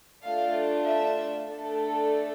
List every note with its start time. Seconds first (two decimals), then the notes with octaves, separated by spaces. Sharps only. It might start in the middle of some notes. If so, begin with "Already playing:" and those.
0.24 A3 D4 F4 A4 F5
0.86 E5
1.49 A3 D4 A4